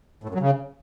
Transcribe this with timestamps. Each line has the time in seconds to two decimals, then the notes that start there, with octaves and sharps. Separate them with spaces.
0.24 A2
0.29 F#2
0.35 F#3
0.40 C#3